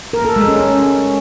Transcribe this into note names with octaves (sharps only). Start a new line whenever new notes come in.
A#4
A4
G#3
C#4